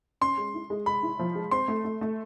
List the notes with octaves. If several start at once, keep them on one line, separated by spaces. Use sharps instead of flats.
C#4 C6
G#3
E4
G#3
G#3 B5
E4
F3
G#3
C4 C6
A3
A3
A3